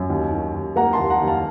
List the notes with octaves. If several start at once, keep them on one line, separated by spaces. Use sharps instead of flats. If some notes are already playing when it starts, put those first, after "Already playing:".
Already playing: F#2
D#2
D#3
D#2
A#3 F#5 A#5
A5 C6
D#2
F#5 A#5
D#2
F5 A5